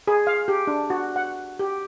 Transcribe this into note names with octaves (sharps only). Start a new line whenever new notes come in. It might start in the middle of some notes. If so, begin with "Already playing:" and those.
G#4
F5
G4
D4
F#4
F#5
G4